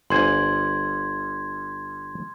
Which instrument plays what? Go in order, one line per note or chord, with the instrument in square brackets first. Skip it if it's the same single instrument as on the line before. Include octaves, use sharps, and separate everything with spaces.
[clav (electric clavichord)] G1 C5 G#5 [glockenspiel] C6 G#6